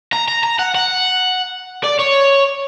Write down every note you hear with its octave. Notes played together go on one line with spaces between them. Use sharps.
A#5
A#5
A#5
F#5
F#5
D5
C#5